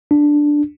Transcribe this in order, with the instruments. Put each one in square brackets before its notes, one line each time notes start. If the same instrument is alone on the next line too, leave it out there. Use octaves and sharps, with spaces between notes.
[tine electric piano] D4